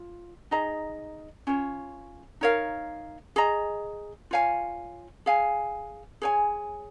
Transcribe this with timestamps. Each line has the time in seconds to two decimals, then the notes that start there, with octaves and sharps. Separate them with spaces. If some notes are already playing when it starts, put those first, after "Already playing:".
Already playing: F4
0.51 D#4 G#4 D#5 A#5
1.47 C#4 F4 C#5
2.41 D#4 A#4 C#5 F5
3.36 G#4 D#5 A#5
4.31 F4 C#5 F5 G#5
5.26 G#4 F5 G#5
6.22 G#4 C#5 G#5